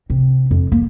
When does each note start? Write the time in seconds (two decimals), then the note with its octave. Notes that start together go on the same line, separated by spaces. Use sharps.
0.10 C3
0.51 F2
0.72 A#3